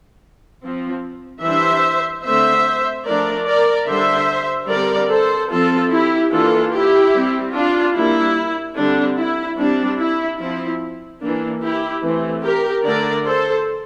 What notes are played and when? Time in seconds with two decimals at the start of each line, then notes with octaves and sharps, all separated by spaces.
0.62 F3 C4
1.43 E3 G3 D4 C5 E5
2.24 D3 A3 C4 C5 E5
3.06 F3 A3 D4 A#4 D5
3.47 A#4 D5
3.88 D3 G3 D4 C5 E5
4.69 D3 G3 C4 A#4 D5
5.10 A4 C5
5.50 F3 C4 F4 A4
5.91 E4 G4
6.32 E3 A#3 D4 F4 A4
6.72 E4 G4
7.13 G3 C4
7.54 D4 F4
7.95 G3 A#3 D4 E4
8.76 D3 G3 C4 D4
9.17 E4
9.57 G3 C4 D4
9.98 E4
10.39 F3 C4 E4
11.21 E3 A#3 D4
11.61 E4 G4
12.02 E3 A3 C4
12.43 G4 A#4
12.83 D3 A3 D4 A#4 D5
13.24 A4 C5